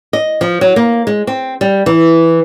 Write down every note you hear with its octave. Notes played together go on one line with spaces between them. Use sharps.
D#5
F3
F#3
A#3
G#3
C4
G3
E3